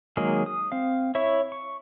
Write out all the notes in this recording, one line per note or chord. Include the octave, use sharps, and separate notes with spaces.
D#3 F#3 G#3 A#3 G#4
D#6
C4 F5
E4 C#5 E5 C#6
C#6